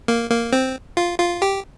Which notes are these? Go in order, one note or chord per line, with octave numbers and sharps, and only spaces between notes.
A#3
A#3
C4
F4
F4
G4